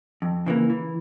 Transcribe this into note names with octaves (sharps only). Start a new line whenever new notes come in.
F2
C#3 E3 A#3
E3